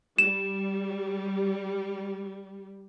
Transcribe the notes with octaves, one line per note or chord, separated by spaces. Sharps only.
G3 E7